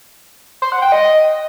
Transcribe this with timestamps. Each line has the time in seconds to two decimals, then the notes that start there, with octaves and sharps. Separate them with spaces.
0.62 C5
0.72 F#5
0.82 G5
0.92 D#5